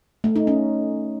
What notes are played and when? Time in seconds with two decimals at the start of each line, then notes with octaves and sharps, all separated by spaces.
0.24 A3
0.36 D#4
0.47 C#4